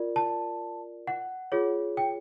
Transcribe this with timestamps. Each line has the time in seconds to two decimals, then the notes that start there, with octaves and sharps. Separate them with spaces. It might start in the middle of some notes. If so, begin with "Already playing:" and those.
Already playing: F4 A#4 D5
0.16 A5
1.07 F#5
1.52 F4 G#4 C#5
1.97 G5